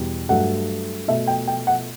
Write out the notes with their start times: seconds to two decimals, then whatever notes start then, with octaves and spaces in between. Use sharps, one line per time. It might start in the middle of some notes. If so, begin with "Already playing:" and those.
Already playing: E2 B2 G3
0.29 G2 F#3 A3 F#5
1.08 B2 A3 E5
1.27 G5
1.47 G5
1.67 F#5